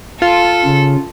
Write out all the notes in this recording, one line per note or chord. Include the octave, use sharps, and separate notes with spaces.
F4 A4
C#3